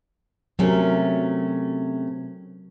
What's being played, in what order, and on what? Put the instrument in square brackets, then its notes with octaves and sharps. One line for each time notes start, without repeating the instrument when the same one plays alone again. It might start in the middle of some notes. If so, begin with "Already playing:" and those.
[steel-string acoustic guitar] C3 A3 C#4 [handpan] F#3 A#4